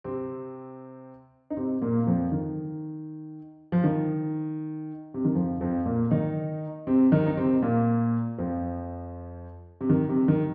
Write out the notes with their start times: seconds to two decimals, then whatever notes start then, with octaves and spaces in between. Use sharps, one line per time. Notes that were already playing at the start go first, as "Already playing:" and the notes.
0.04 C3 C4
1.50 D#4
1.57 C3 C4
1.81 A#2 A#3
2.07 F2 F3
2.32 D#3
3.72 F3
3.84 D#3
5.14 C3
5.25 D#3
5.35 F2 F3
5.61 F2 F3
5.86 A#2 A#3
6.11 D#3 D#4
6.87 C3 C4
7.12 D#3 D#4
7.26 D#4
7.37 C3 C4
7.62 A#2 A#3
8.38 F2 F3
9.81 C3
9.90 D#3
10.09 C3
10.28 D#3